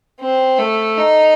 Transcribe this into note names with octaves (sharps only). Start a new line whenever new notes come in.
C4
A3
D#4